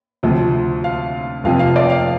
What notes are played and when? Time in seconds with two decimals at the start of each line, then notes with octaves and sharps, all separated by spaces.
0.23 D2 C3 F3
0.84 F5
1.44 F1 F2 C3 F3 F5
1.59 F5
1.76 D5
1.90 F5